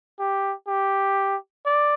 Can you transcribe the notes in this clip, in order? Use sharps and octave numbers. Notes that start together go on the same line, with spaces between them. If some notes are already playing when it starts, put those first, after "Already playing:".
G4
G4
D5